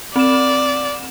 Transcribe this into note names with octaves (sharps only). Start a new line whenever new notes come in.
C4 D5 E7